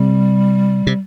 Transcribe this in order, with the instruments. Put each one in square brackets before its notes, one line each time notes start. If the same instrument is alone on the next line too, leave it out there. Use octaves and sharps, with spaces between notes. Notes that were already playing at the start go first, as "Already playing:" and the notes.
Already playing: [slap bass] C3 [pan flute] G3
[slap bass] C3